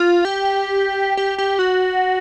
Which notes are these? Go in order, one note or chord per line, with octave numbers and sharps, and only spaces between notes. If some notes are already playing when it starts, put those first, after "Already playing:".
Already playing: F4
G4
G4
G4
F#4